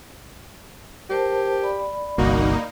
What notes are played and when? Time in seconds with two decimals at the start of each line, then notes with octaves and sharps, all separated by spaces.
1.10 G4 A#4 C5 A5
1.62 D5 B5
2.18 G1 C2 A#3 D#4 F#4